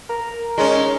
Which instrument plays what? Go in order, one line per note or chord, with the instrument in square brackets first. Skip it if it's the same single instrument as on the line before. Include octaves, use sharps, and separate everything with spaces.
[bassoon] A#4
[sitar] G#3 C#4 [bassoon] D#4